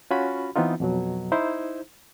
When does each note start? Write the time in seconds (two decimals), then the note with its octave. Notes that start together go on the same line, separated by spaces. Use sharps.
0.11 C#4 F4 F#4 B5
0.56 E3 B3 C4 D#4 F4
0.80 F2 B2 F#3
1.32 D#4 E4 C5